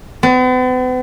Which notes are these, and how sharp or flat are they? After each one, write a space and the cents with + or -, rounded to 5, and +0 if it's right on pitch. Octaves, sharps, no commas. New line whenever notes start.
B3 +45